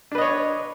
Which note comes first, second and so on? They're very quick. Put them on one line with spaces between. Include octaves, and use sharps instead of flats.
D4 B4 D#5 C#5